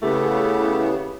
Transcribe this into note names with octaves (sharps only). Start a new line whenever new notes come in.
C#3 A3 B3 E4 G4